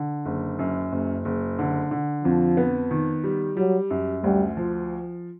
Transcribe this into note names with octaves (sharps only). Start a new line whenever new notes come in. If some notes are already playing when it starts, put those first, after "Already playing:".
Already playing: D3
F#1
F#2
F#1
F#1
D3
D3
F2 F3
B3
D#3
G3
F#3 G3
F#2
D2 G3
F3